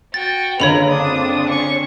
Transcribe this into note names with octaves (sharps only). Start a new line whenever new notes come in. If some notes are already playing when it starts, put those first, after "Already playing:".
F#4 G5 A6
F#1 D3 F4 A#4 B4 C#5 B5 F7
C4 D4 D#6
C#4 C#6